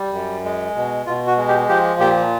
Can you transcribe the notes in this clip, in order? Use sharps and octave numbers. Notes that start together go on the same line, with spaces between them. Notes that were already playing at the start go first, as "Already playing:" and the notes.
Already playing: G3
F#2
G#3
B2
B2 F4
F#4
G#3
G4
F3 G4
A#2 G4